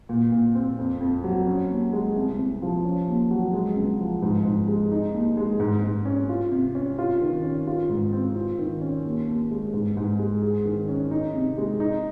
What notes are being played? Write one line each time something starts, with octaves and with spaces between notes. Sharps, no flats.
A#2
A#2
C4
F2
F2
F#3
C#4
D#2
G#3
C2
C2
F3
C#4
D#2
F#3
G#3
C#2
F3
G#2
G#2
G#3
D#4
D#2
G#3
G#2
G#2
C#4
F4
C3
C#4
F4
D#3
C#4
F4
G#2
C4
F4
D#3
C#4
D#2
D#2
G#3
G#2
G#2
G#3
G#4
D#3
C#4
D#4
C3
G#3
D#4